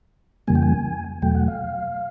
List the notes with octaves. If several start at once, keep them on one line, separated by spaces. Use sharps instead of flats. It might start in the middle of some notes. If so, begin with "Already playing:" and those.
F2 C#3 E3 G3 A#3 G#5
G5
G#5
E2 B2 F#3 A3 G5
F#5
F5